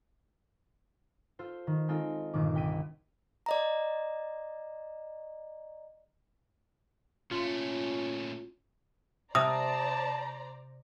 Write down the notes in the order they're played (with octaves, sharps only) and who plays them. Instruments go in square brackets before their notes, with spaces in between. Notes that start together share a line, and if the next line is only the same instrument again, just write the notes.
[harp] F4 A4 C5
D#3
G#3 C4 D#4 F4 A4
G1 A#2 D#3 D6
C2 G5 B6 D#7
[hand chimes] D5 D#5 A#5
[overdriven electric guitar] A#2 A3 [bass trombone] C#4 [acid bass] F4
[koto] C3 [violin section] C5 D5 A#5 [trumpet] A5 [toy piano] D#6